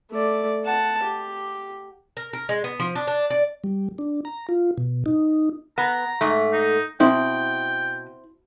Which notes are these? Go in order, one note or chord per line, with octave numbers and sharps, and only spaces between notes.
A3 D5
F#5 A5
G4
A#4
A#4
G#3
B3
F3
D4
D4
D5
G3
D4
A#5
F4
B2
D#4
B3 A#5
G#2 A3
D#4
B2 C4 E4 G5